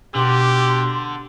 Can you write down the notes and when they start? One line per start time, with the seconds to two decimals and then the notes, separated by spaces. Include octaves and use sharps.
0.15 B2 D3 G4 C6